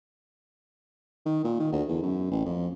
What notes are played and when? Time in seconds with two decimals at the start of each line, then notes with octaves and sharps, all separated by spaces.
1.26 D#3
1.44 A#2
1.59 D#3
1.72 D2
1.88 E2
2.02 F#2
2.31 A1
2.45 F2